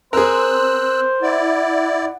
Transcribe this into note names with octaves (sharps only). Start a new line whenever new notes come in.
C4 G#4 A#4 C5 E6 F#6
E4 D5 F#5